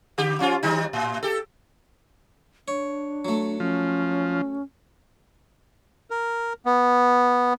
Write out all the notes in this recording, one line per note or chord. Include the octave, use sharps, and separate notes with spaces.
D3 G4
F3 C#4 F4
D#3 G3 D#4
A2
G4 A4
D4 C#5
F#3 A3
F3 C#4
A#4
B3